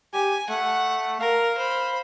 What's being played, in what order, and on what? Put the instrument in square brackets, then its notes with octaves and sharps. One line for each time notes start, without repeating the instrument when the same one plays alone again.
[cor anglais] G4 [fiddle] G#5
[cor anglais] A3 [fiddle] F#5
[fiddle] A#4 [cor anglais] F5
[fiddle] C5 B5